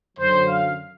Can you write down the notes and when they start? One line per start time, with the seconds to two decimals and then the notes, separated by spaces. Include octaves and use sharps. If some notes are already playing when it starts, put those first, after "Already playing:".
0.18 F#2 D3 F#3 C5
0.48 F5